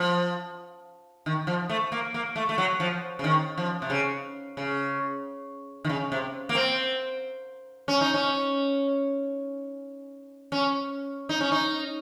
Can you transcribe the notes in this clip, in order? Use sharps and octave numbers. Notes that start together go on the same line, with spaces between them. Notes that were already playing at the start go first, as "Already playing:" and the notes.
Already playing: F3
D#3
F3
A3
A#3
A#3
A3
A3
F#3
F3
C#3
D#3
F3
C3
C#3
C#3
D#3
C#3
C3
A#3
C4
C#4
D#4
C#4
C#4
D#4
C#4
D#4